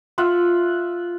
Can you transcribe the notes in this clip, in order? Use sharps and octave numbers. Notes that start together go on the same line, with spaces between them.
F4 E5 F#5